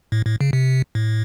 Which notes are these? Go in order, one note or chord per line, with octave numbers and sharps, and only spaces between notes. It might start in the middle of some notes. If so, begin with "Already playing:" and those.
A2
A2
C#3
C3
A2